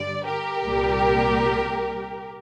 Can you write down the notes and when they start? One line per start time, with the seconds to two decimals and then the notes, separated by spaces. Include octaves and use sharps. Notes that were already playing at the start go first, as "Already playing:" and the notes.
Already playing: G2 D3 G3 D5
0.25 G4 A#4
0.63 C2 A#2 G3